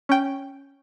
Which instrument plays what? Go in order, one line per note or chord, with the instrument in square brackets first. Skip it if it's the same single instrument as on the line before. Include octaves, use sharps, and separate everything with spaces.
[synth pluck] C#4 G5